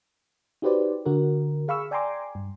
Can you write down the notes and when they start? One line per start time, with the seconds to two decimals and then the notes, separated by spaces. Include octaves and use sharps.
0.62 D#4 F#4 G4 B4 C5 D5
1.06 D3 F#4 A#4
1.68 G#4 F5 B5 C#6 E6
1.91 D5 G5 G#5 A#5 C6 D6
2.35 G2